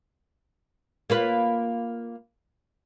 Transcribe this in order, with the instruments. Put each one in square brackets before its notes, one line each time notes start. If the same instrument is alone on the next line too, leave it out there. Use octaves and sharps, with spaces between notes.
[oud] A#3 F4 B4